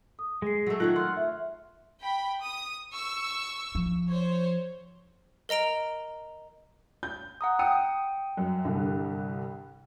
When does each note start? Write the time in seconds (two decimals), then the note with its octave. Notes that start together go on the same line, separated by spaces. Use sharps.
0.19 D#6
0.42 G#3 G#4 C7
0.67 F#3 A3
0.80 D#3 A3 F4 C#5 F#5
0.96 F4 C6 F6
1.17 E5
2.02 G5 B5
2.41 D#6
2.93 C#6 E6
3.75 F3
4.07 C5 C#5
5.49 A#4 D#5 A#5 D7 F7
7.03 G6
7.41 F#5 A#5 D#6
7.59 G5 D#6 C#7
8.37 F#2
8.65 C2 G2 D3